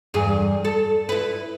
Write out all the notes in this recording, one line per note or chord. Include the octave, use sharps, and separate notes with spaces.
E2 G2 G#4
A4
E4 B4